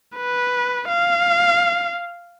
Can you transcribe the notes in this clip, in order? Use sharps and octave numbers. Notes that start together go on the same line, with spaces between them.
B4
F5